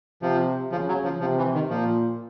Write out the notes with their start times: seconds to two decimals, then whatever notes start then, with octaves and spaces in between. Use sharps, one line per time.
0.22 C3 F3
0.72 C#3 F3
0.88 F#3
1.04 F3
1.21 C3 F3
1.38 E3
1.54 D#3
1.70 A#2 F3